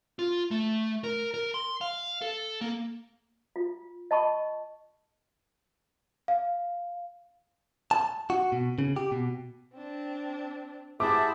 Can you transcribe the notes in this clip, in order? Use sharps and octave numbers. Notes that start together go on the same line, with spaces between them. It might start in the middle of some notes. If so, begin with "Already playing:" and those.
F4
A3
A#4
A#4
C6
F5
A4
A#3
F4
D#5 A5 B5 C#6
F5
A5
F#4
B2
C#3
G4
B2
C4 D4
E4 G4 G#4 C5 E5 F#5 A5 D6